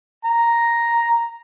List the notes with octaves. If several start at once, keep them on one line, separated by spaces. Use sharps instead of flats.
A#5